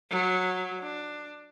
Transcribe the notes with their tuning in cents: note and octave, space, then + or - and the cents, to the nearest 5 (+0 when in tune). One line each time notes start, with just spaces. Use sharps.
F#3 -10
D4 +15